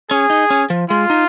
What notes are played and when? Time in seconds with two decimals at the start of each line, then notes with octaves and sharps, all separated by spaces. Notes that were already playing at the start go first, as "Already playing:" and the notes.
0.11 C#4 G#4
0.30 D#4
0.50 C#4
0.70 F3
0.90 G#3 F4
1.10 D#4